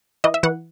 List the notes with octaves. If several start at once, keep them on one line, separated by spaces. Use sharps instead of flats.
E3 D#5
E5
E3 F#5